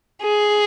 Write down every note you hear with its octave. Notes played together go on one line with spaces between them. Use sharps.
G#4